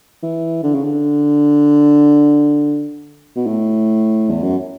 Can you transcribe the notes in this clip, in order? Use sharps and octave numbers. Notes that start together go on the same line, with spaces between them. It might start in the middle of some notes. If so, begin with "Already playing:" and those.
E3
D3
C#3
D3
B2
A2
E2
F#2